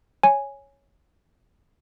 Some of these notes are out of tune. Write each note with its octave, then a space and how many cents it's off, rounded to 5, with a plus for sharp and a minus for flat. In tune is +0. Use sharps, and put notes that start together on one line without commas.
C#5 +0 G#5 +0